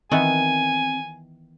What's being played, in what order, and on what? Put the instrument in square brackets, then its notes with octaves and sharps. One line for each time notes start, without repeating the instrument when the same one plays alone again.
[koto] D#3 E3 B3 [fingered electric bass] C4 [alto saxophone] G#5